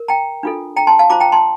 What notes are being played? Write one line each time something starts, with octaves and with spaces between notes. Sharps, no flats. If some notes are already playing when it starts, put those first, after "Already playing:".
Already playing: A#4
G5 A#5
D4 F4 A4
G5 A#5
A5 C6
F5 A5
F4 C5 A#5 D6
G5 A#5
A5 C6